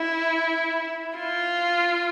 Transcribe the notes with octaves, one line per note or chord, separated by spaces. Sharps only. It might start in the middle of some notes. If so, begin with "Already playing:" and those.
Already playing: E4
F4